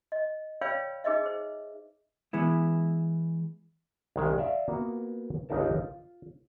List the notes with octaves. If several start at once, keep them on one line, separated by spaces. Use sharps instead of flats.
D#5
B4 C#5 D5 F5 G5 B5
D#4 G#4 B4 D#5 E5
G#4 C5
E3 G#3 B3 E4
C2 D#3 G#3
D5 E5 F5
A#3 B3 F4 F#4 B4
G1 C#2 D4 D#4 A#4 A5
F4